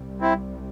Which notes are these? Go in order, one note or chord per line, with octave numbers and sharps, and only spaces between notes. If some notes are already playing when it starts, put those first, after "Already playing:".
Already playing: C2 C3 G3
C4 E4